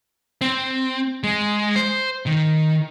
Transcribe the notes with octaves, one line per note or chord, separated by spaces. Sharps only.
C4
G#3
C5
D#3